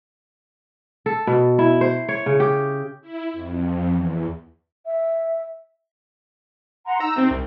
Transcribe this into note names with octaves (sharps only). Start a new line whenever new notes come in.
A4
B2
E4
C5
C#5
C#3
G4
E4
F2
E2
E5
F#5 A#5 C6
D#4 A#5 E6
C3 C4
C2